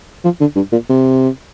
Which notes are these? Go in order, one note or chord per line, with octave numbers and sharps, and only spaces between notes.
F3
D3
G2
A#2
C3